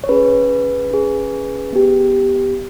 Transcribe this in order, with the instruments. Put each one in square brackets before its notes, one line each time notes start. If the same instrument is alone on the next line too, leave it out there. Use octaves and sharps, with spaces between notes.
[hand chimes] C#5
C#4 G#4 B4
C#4 G#4
B3 G4